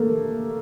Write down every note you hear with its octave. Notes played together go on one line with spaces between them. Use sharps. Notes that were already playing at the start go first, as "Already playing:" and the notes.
Already playing: A3 A#3